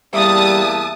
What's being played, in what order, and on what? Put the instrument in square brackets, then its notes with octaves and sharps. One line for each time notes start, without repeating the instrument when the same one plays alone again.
[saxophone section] E2 A#3 E5 [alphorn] G3 [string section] A5 D#6